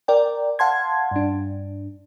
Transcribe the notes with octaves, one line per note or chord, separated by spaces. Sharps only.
A#4 D5 G5
F5 F#5 A5 C6 G#6
G2 D4